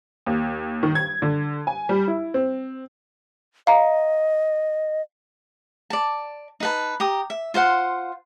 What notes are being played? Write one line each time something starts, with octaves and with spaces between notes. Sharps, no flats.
D#2
D#3
G#6
D3
G#5
G3
E4
C4
D#5 F5 A#5
D5 A5
D#4 B4 A5
G4 A#5 D#6
E5
F4 C5 F5 F#5